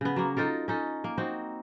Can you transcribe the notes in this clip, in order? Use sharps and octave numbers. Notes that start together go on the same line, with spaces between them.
C#3 B3
F#3 A#3
D#4 F4 A4 A#4
C#4 D#4 A4
A#3
C4 D#4 F#4